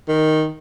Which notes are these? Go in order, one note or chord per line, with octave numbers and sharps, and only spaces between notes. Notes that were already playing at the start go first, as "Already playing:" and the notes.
D#3